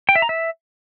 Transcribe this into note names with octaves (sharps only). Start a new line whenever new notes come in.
G5
E5
A#5
E5